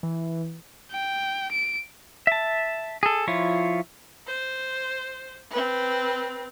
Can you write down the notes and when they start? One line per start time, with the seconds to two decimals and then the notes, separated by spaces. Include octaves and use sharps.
0.03 E3
0.92 G5
1.52 D7
2.27 E5 A5
3.03 G#4 A4
3.27 F3 E4 F4 C#5
4.27 C5
5.51 C4 B4